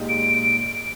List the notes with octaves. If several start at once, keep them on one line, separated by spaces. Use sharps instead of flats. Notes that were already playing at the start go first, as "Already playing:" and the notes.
Already playing: A#2 G#3 D#4 G4
D7
D7